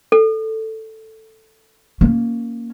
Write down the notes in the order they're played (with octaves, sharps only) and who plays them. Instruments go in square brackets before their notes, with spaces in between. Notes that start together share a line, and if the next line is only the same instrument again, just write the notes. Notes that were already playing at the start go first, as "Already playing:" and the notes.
[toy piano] A4
[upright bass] A#3 C#4